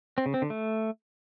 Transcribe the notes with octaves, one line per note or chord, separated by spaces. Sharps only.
C4
C#3
C4
D3
A3